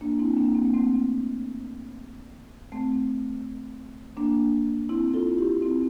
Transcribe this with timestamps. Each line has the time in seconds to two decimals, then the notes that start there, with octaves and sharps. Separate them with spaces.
0.01 A#3 D4
0.19 C4 E4
0.37 A#3 D4
0.55 C4
0.64 A#3
0.74 A3 C4
2.72 A3 C4
4.17 A#3 D4
4.89 C4 E4
5.14 F4 A4
5.38 E4 G4
5.62 C4 E4